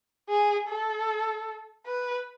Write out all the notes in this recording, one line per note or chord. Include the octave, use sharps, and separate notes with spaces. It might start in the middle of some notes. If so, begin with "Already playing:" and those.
G#4
A4
B4